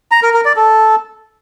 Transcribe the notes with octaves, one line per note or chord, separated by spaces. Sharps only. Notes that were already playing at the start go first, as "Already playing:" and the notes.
A#5
A#4
A#4
D5
A4